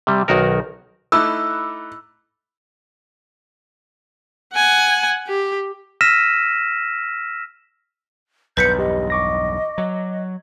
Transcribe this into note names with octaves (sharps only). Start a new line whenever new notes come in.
C3 G3
B1 D#3 F#4 A#4
A3 D#4 E4 B5 D6 E6 F#6
F#5 G#5
G4
E6 F6 A#6 B6 D#7 E7
B1 E2 G2 B4 G6 B6 C#7
G4 D#5
C#6 D6 A#6
F#3